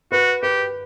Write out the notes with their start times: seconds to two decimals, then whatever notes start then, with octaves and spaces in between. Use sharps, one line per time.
0.12 F#4 B4
0.43 G4 B4